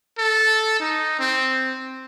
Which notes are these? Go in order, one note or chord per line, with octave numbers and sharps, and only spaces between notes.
A4
D#4
C4